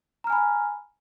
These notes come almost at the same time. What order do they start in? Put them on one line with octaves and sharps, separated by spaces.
A#5 F6 G#5 B5